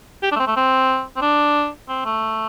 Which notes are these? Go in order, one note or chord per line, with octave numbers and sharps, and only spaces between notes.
G4
D4
A3
C4
A3
C4
C4
D4
C4
A3